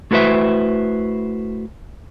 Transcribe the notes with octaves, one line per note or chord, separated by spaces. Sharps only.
A3 E4 F#4 B4 C5 E5